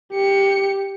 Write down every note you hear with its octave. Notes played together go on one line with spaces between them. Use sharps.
G4 C#7